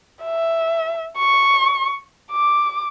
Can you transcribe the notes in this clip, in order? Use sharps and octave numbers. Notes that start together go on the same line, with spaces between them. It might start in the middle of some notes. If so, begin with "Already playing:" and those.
E5
C#6
D6